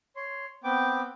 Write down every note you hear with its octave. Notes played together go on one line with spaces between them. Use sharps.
C#5 C6
B3 C4 G5 D6